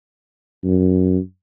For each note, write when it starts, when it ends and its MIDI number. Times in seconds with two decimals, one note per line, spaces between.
0.64 1.18 42